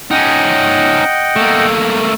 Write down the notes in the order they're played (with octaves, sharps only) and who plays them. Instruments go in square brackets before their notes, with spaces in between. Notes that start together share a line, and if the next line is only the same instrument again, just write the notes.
[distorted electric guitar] C#4 D#4 [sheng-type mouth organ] D#5 F#5 G5
[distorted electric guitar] A3 A#3